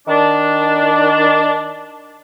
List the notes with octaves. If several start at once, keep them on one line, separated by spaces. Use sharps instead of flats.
D#3 D4